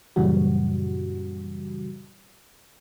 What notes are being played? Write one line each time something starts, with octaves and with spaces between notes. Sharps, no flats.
F#2 A#2 C#3 E3 G3 F#4